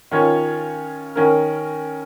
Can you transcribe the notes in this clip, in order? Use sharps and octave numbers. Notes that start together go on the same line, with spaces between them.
D#3 C#4 F4 C#5
D#3 C#4 A#4